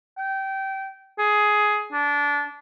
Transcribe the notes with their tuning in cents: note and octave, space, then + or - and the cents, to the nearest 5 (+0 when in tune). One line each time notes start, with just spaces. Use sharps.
G5 -20
G#4 +10
D4 -20